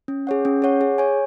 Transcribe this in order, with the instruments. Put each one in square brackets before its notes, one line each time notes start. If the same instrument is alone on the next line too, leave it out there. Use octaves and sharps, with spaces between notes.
[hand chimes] C#4
G#4 C#5 F#5
C#4
G#4 C#5 F#5
G#4
C#5 G#5